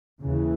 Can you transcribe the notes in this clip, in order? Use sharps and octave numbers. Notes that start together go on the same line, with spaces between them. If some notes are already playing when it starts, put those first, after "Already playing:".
D#2 C#3 E3